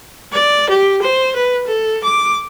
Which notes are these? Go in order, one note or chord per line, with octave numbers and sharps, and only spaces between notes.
D5
G4
C5
B4
A4
D6